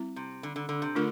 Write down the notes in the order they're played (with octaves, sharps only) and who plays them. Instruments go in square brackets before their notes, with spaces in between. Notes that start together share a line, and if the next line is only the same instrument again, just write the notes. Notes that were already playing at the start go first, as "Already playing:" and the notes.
Already playing: [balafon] G3 C4 E4
[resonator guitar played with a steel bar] C3
D3
D3
D3
C3
[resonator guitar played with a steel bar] D3 [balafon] A3 D4 F4 A#4